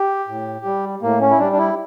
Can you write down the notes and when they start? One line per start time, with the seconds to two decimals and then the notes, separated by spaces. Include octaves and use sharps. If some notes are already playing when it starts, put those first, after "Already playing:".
Already playing: G4
0.28 A2
0.65 G3
1.02 A2 A#3
1.21 C#4
1.31 E4
1.39 G3 D4
1.53 D4
1.58 E4